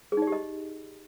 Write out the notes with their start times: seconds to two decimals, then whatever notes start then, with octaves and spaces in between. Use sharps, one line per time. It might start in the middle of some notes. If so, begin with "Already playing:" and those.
0.12 G#4
0.17 D#4
0.22 D5
0.27 G4
0.32 D#5